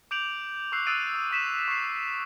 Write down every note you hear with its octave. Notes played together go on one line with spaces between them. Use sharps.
D6 G6 D7 F7 F#7
C#6 D6 E6 F#6 C7
D#6 E6 F#6 A6 D7 D#7
D6
C#6 B6 E7
C#6 C7